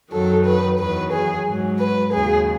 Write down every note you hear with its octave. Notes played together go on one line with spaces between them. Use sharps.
F#2 D#3 F#3 A4
B4
E2 D#3 F#3 B4
G#4
G#2 F#3
B4
D#2 C#3 F#3 G#4